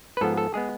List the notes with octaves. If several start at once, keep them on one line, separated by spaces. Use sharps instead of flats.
B4
G#2 F3 B3 A4
A4
G#3 B3 G#4